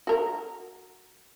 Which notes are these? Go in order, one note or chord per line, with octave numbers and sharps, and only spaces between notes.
F#4 A#4